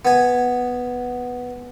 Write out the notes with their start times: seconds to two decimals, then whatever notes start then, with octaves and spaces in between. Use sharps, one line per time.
0.05 B3 G#5